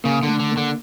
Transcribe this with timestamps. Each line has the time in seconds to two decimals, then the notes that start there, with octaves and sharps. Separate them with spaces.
0.04 C#3 A#3
0.23 D3
0.28 A3
0.40 D3
0.52 A#3
0.57 D3